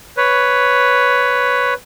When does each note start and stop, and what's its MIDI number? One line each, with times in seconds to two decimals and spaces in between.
0.17 1.74 71
0.17 1.74 73